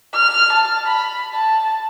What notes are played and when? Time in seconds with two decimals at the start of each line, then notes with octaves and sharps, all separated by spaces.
0.14 F6
0.53 A5
0.88 B5
1.33 A5